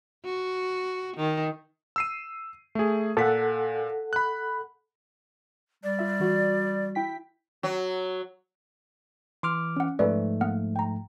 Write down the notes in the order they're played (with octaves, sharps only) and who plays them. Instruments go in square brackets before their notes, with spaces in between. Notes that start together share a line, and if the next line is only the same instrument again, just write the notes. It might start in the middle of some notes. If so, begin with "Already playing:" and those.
[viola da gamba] F#4
D#3
[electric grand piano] E6 C7 D#7
A3 G#4
[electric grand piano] A#2 B6 [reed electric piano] A4 F#5
[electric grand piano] B5 F#6
[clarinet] G3 [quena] D5
[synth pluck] F4 E5
E3 F#4
E4 G5 B6
[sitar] F#3
[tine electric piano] E3 D6 F6 [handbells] C6
[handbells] C#4 F#5
[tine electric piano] G#2 F3 A3 [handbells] A4 B4 D5
[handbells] A#3 F#5 F6
G5 A#5